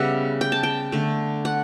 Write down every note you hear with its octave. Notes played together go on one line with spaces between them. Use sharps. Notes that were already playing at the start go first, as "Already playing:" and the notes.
Already playing: C#3 G3 B3 E5 F#5
G5
A5
G5
D3 A3
F#5